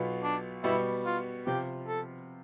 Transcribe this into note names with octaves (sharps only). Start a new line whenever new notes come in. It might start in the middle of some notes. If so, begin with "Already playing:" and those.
Already playing: B1 B2 B3 F4
D4
B2 G3 B3 E4
F4
C3 F3 C4 F4 G4
A4